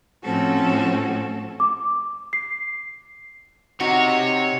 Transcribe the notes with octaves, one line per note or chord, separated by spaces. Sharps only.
A2 F3 C4 C#4 F#4 A4
D6
C7
C3 D#4 F#4 C#5